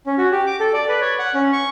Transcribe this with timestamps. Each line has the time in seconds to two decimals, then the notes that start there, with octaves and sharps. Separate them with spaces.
0.06 C#4
0.18 F#4
0.32 G4
0.47 D6
0.60 A4
0.73 D5
0.89 B4
1.01 C#5
1.19 F#5
1.34 C#4
1.53 C#6